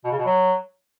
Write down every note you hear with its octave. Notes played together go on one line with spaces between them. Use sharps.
B2
C#3
B2
F#3